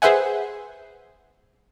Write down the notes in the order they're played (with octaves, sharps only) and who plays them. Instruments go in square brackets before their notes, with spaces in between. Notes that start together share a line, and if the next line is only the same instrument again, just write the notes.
[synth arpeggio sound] G#4 B4 C5 E5 F#5 G#5